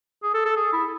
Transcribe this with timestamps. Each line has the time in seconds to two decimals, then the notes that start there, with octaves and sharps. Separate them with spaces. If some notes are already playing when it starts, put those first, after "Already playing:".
0.23 G#4
0.34 A4
0.45 A4
0.56 G#4
0.73 E4